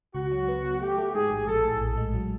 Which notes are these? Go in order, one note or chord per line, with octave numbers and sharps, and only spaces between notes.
C#2 F#4
F#3
B3
B3
A3 G4
A3
G#2 G#4
A1
A#1 A4
A2
A2
G#3
F#3